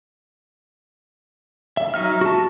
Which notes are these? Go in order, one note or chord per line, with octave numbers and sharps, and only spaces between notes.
E5
F#3 D#4 E5 F6
F#4 A5